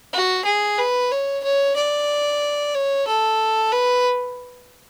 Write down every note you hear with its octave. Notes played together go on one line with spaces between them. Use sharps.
F#4
G#4
B4
C#5
C#5
D5
C#5
A4
B4